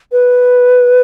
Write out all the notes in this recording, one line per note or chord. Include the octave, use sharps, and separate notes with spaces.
B4